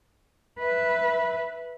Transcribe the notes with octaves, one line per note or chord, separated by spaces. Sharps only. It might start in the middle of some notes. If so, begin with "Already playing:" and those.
B4 E5